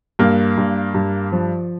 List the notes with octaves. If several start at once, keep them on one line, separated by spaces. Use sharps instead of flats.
G2 A#3
G2
G2
F3